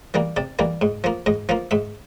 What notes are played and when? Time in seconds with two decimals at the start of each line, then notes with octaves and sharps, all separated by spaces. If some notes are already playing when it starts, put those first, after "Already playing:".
0.14 E3 G3 A#3
0.37 C3 D5
0.59 E3 G3 A#3
0.81 G#2
1.04 F3 A#3
1.26 G#2 D#5
1.49 F3 A#3 F5
1.71 G#2 E5